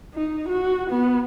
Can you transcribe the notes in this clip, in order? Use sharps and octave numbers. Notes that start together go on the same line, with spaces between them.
D#4
F#4
B3